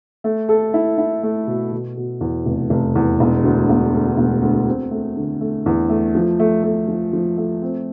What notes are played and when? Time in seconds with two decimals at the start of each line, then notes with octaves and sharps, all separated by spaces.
0.24 A3
0.49 A4
0.74 E4
0.98 E4
1.23 A3
1.48 B2
1.72 B2
1.97 B2
2.21 E2
2.46 F1
2.70 F1
2.95 E2
3.20 E1
3.44 D2
3.69 E1
3.94 D2
4.17 E1
4.42 D2
4.68 C4
4.91 A3
5.17 D3
5.41 A3
5.66 E2
5.89 A3
6.15 F3
6.40 A3
6.63 A3
6.88 F3
7.13 F3
7.37 A3
7.62 C4